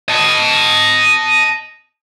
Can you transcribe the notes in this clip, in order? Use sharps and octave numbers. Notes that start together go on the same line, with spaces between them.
D#5 A5